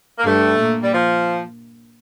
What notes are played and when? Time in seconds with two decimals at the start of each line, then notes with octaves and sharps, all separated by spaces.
0.19 A#3
0.25 G2 G3 A3
0.59 A#2 A#3
0.83 G3
0.93 F3